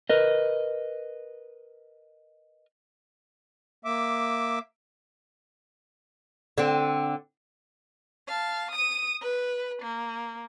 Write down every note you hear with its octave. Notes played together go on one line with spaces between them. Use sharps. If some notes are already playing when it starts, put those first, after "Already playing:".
A#4 B4 D#5
A#3 E5 D6
D3 C4
F5 A5
D#6 D#7
B4
A#3